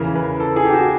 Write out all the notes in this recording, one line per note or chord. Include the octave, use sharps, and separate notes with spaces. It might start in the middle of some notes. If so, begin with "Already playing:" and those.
Already playing: E2 C#3 E3 A#4
B4
A4
G#4
G4
F#4